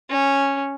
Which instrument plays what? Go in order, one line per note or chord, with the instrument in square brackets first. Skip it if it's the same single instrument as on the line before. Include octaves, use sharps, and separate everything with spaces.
[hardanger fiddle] C#4